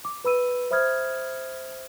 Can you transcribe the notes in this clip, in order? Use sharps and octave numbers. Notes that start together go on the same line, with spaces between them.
D6
B4 B5 E6 D#7
C5 E5 B5 D#6 F6 G#6